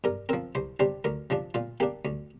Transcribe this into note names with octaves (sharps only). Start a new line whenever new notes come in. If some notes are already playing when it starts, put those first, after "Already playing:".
G2 A#4
F3 C4 A#4
C2 C5
C3 G3 D4 C5
D2 A#4
C3 F3 D4
A#2 F4
A#3 D4 G4
D2